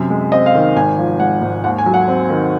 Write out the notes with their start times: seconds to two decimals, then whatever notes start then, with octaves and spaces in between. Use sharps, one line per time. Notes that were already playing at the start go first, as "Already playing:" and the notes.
Already playing: F#2 C3
0.10 G#3
0.32 C4 D#5
0.46 F5
0.55 D#3
0.76 G#1 G#5
0.98 F3
1.20 G#3 F#5
1.42 G#2
1.64 D#2 F#5
1.78 G#5
1.86 F#3
1.94 F#5
2.08 C4
2.30 D#3